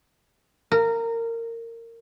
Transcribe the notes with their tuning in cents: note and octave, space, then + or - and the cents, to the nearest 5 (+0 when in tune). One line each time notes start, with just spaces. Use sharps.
A#4 -20